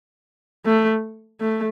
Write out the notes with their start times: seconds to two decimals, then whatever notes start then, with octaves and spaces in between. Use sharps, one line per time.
0.65 A3
1.40 A3